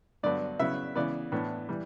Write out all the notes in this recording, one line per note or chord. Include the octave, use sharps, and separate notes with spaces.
G2 D3 F#3 B3 D4 D5
C#3 F#3 B3 E4 E5
C#3 E3 B3 D5
A2 E3 B3 D4
E3 G3